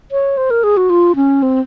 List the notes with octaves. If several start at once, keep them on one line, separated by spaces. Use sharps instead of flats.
C#5
C5
A#4
G#4
F#4
F4
C#4
C4